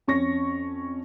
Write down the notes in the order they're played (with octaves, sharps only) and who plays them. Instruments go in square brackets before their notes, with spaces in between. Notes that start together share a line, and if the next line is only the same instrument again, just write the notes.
[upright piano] F2 C#4 C#6 A#6